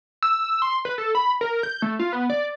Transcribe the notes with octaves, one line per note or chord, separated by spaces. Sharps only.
E6
C6
B4
A4
B5
A#4
G6
A3
F4
B3
D5